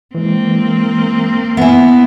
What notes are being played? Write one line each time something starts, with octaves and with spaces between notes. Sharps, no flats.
E3 G#3 A#3 C4
B3 E4 E5 G#5